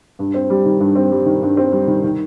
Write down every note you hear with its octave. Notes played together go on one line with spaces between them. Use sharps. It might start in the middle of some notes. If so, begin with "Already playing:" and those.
G2
C4
G3
D#3
G2
C4
G3
D#3
G2
C4
G3
D#3
D#3